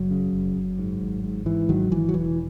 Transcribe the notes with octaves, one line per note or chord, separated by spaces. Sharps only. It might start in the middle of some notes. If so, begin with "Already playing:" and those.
Already playing: F#1 F#3
C#3
F#1
F#1
G#2
G#1
G#2
G#2 E3
G#1 D#3 F#3
G#1 E3
F#3
E1 E3